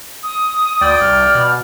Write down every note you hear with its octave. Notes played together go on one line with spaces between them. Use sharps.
D#6
D2 D5 G5
C2 F6
B2